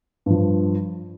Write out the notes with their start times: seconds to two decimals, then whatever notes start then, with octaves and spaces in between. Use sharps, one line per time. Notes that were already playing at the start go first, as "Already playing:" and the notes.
0.26 G2 F3